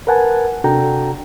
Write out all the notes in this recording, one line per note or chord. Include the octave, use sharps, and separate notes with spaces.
A#4 B4 F#5 G#5 A5
C3 D4 F#4 A4 G5 A#5